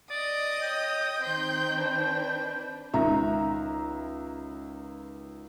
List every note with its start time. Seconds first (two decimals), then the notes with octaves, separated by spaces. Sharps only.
0.10 D5 D#5 D#6
0.61 C#5 G5
1.23 D#3 C4 C6 G6
1.78 D4 B4
2.93 C#2 D#3 E5 A#5